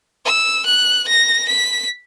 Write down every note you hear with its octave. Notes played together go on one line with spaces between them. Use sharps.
E6
F#6
A#6
B6